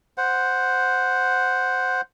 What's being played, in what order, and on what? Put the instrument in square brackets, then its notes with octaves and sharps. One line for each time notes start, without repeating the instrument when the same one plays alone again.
[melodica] C5 F#5